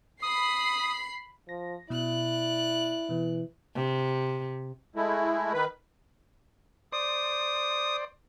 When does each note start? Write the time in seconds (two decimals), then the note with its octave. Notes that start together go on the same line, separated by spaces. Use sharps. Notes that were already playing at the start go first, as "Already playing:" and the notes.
0.22 B5 D#6 C7
1.49 F3 A#6
1.90 B2 E4 D5 F#6
3.10 B2 E3
3.75 C3
4.96 G#3 A3 E4
5.53 D#3 B4
6.92 C5 D5 D#6